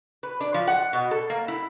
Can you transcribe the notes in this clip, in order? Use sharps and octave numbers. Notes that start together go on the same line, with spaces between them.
B4
D4
F3
F#5
B2
A4
A#3
E4